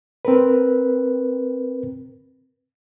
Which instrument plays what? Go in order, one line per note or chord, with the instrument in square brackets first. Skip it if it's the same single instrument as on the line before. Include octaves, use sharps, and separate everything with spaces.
[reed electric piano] C4 A#4 B4